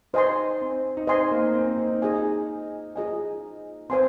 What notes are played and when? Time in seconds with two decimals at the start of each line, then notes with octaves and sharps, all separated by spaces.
0.13 D#4 C5 D#5 G#5 C6
0.61 C4
0.97 D#4
1.07 C4 C5 D#5 G#5 C6
1.31 A#3
1.55 C4
1.78 D#4
2.02 F4 G#4 D#5 G#5
2.96 F4 G#4 D#5 G#5
3.90 C4 C5 G#5 C6